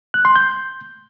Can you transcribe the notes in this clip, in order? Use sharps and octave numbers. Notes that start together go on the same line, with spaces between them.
F#6
C6
G6